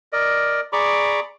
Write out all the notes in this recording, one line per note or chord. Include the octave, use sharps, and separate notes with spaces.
A#4 D5 D#5
G#4 D5 A#5 B5 C#6 D6